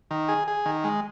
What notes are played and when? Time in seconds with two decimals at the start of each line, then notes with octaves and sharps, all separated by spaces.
0.11 D#3
0.28 G#4
0.48 G#4
0.66 D#3
0.84 G#3